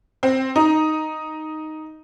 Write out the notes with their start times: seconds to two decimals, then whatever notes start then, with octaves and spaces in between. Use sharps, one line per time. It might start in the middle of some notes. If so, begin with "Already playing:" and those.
0.23 C4
0.56 D#4